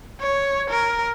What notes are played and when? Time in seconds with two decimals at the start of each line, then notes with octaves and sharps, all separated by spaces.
0.21 C#5
0.70 A#4